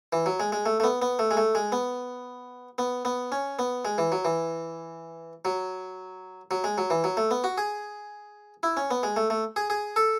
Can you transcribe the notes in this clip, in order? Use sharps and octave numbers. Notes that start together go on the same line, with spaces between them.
E3
F#3
G#3
G#3
A3
A3
B3
B3
A3
G#3
A3
G#3
B3
B3
B3
C#4
B3
G#3
E3
F#3
E3
F#3
F#3
G#3
F#3
E3
F#3
A3
B3
F#4
G#4
E4
C#4
B3
G#3
A3
A3
G#4
G#4
A4